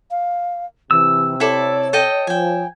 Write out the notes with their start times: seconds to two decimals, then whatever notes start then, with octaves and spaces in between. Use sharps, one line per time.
0.11 F5
0.91 C3 E3 E6
1.40 E4 A4 C#5 D5
1.93 A4 D#5 G5
2.27 F3 G5 G#5